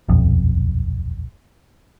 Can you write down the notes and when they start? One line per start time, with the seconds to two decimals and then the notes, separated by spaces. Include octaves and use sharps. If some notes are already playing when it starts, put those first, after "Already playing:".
0.09 D#1 B1 F2